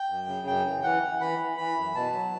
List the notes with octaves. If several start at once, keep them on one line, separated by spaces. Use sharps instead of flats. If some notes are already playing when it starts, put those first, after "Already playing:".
Already playing: G5
F#2
C#3
F#2 G5
E3
E3 F#5
E3
E3 B5
E3
E3 B5
F#2
B2 A5
F#3